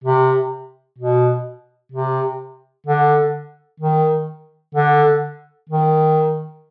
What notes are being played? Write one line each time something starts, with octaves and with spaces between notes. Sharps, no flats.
C3
B2
C3
D3
D#3
D3
D#3